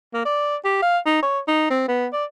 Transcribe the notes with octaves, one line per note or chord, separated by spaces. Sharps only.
A#3
D5
G4
F5
D#4
C#5
D#4
C4
B3
D5